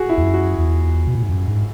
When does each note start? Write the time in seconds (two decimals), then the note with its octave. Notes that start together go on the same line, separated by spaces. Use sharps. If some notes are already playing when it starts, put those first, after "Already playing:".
Already playing: F#4 G#4
0.09 E4
0.17 E2
0.22 F#2
0.34 F#4
0.58 E2
1.07 B2
1.15 A#2
1.23 G#2
1.30 F#2
1.48 G#2